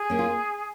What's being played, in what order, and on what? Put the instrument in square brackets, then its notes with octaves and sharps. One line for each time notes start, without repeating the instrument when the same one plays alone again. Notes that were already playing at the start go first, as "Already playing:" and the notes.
Already playing: [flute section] G#4
[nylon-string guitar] A#3 C#4
F4